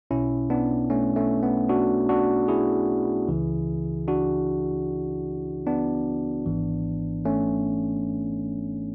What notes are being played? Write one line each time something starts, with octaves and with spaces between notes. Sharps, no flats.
B1 B2 C#4 E4
B3 D4
A3 C#4
A3 C#4
B3
D4 F#4
D4 F#4
E4 G#4
C#2 C#3 E3
D4 F#4
B3 D4
G#1 G#2 E3
A3 C#4